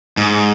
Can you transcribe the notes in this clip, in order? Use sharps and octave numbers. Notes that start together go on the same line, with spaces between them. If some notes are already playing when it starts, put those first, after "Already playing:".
G#2